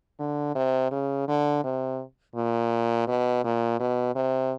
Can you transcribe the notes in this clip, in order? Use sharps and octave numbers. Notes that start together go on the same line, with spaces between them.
D3
C3
C#3
D3
C3
A#2
B2
A#2
B2
C3